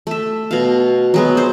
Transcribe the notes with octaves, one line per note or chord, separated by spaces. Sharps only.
A3 E5
B2 F5
F#3 G#3 B3
C5